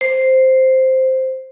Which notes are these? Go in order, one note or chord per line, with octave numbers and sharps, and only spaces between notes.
C5